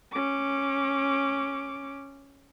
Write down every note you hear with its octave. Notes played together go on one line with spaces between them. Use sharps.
C#4 D6